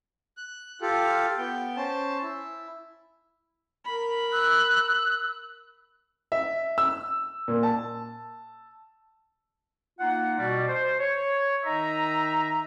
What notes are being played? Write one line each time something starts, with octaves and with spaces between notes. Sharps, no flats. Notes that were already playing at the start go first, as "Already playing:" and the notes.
F#6
F4 G4 A4
B3 G5
C#4 C5 A5
E4
A#4 B5
E6 F#6
E5
E6
A#2
A5
A#3 D#4 F4 F#5
B2 G3 D5
C5
C#5
D#3 D#4 D#5 E5 A#5